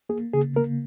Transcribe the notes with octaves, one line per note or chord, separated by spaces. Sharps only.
A#3 G#4
C#3 G#4
A#3 A#4